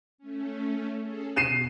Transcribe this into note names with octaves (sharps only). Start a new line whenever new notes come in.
A3 C#4
C#4 G#4 A4
B2 C7 D#7 E7